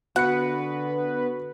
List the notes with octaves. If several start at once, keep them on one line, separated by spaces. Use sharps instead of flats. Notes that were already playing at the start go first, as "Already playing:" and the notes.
D3 B3 F#4 B4 F#5 C#7